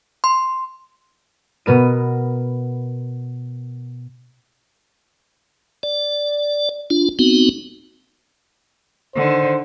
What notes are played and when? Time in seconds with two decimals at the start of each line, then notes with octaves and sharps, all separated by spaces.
0.24 C6
1.66 B2 B3 A#4 D#7
5.83 D5
6.90 D4 F4
7.19 B3 C4 D#4 F#4
9.16 D3 D#3 C5